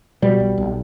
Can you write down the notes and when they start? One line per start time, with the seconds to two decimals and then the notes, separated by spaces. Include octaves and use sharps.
0.22 B2 G3
0.40 B1
0.58 B1